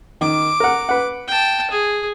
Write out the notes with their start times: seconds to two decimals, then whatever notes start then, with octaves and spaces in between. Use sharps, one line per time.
0.21 D#3 D6
0.60 A#4 F#5
0.89 B4 F#5
1.28 G5 A5
1.71 G#4